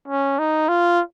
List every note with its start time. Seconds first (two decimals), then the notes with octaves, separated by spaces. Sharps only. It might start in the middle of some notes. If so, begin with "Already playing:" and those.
0.08 C#4
0.39 D#4
0.69 F4